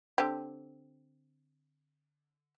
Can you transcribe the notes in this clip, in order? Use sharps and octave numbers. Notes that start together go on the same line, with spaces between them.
D3 C4 G4